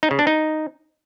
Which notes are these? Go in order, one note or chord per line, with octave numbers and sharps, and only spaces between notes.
D#4
C#3
D4
D#4